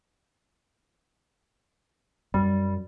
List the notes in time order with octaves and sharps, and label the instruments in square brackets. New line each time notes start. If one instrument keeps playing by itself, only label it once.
[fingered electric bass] F#2 [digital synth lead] G3